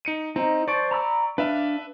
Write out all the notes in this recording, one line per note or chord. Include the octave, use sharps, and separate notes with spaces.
D#4 C#7 D#7
C4 D#4
C5 D5 A5 C#6 D7
A#5 B5 E6
D4 B4 E5 F5